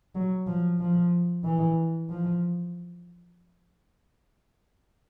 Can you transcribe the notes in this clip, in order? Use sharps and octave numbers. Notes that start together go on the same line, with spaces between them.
F#3
F3
F3
E3
F3